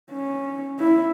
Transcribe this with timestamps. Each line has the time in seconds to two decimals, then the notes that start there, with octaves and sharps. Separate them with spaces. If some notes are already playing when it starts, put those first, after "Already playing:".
0.12 C#4
0.79 E4